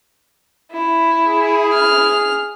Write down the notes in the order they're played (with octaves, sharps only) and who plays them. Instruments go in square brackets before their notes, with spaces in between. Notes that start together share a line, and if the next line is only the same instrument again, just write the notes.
[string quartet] E4
[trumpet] G#4
[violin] F6